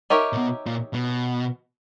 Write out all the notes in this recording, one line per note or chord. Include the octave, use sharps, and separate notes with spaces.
D#4 G4 A#4 C#5 E5
A#2
B2
A#2
B2